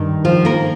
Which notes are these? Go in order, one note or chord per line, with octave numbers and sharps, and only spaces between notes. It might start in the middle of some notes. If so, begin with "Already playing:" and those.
Already playing: G2 D#3
F3 F4
A#3 A#4